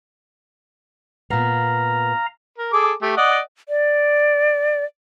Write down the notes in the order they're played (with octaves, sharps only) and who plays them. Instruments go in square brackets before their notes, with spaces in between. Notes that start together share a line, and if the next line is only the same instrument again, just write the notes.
[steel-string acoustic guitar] A#2 B3 [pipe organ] F5 A#5
[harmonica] A#4
G#4 A4 D6
A3 G4
D5 D#5 F#5
[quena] D5